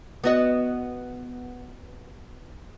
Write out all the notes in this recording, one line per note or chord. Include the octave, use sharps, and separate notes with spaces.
B3 F#4 D#5